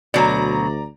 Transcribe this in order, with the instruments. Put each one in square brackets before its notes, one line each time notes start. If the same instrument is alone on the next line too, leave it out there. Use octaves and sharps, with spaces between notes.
[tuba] D2 [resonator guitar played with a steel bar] B2 F#3 [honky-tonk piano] D5 A#5